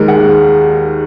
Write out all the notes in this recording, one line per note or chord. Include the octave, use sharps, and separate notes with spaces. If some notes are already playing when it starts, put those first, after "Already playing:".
Already playing: D#2 D#3 G#3 A#4
F#5